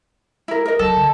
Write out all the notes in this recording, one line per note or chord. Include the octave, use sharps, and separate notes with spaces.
E4 A#4
A#4 D#5
F#3 A4
D3